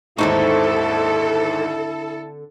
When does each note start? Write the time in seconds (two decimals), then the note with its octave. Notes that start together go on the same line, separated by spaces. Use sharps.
0.18 D#2 G#2 D3 C4 D#4 E4 A4 C#6